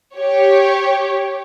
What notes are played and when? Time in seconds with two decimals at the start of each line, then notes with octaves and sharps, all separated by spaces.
0.13 G4 C#5